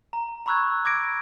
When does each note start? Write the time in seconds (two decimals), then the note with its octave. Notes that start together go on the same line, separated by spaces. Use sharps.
0.13 A#5
0.46 A#5 B5 C#6 E6 F#6 G#6
0.85 D6 G#6 A#6 D7